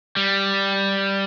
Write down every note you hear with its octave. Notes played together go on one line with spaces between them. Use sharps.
G3